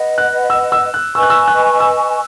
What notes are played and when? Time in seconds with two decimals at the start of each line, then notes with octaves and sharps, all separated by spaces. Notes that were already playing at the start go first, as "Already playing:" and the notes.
Already playing: B4 D#5 F#5
0.18 F#6
0.50 E6
0.72 E6
0.94 F#6
1.15 B4 D#5 G#5 C#6 E6
1.23 F#6
1.30 E6
1.47 F#6
1.80 E6